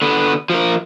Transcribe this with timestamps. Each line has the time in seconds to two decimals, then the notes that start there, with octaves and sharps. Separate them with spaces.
0.02 D3 B3
0.50 F3 A#4